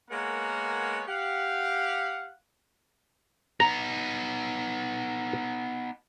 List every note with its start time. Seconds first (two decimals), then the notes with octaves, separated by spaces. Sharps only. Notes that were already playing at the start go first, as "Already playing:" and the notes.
0.11 G#3 A#3 B3 A#4 C#5 F#5
1.07 G4 F5 F#5
3.60 B3 D#4 A#5